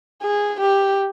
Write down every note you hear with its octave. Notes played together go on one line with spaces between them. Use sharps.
G#4
G4